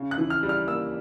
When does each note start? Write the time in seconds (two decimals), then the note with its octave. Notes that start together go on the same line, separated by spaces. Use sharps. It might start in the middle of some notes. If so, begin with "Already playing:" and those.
Already playing: C#3
0.11 F#6
0.18 E3
0.30 F6
0.43 G3
0.49 F6
0.68 A#3 E6